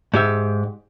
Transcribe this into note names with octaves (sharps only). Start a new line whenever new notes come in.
G#2 G4 E5